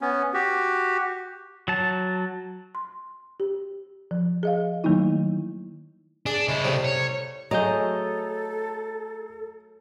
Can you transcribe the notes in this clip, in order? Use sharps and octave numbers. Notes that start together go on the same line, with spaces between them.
B3 C#4
F#4 G4
F#3 A5
C6
G4
F3
G#4 D#5 F5
D#3 F#3 A3 A#3 D#4 E4
D4 G#4
C#3 G#3 E4
A2 C3 G3
C#5
F#3 A3 G#4 A4 D#5 A#5 G6